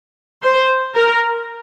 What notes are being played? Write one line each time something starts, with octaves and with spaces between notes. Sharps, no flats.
C5
A#4